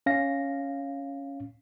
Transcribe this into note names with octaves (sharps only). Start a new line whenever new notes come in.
C#4 F5 A#6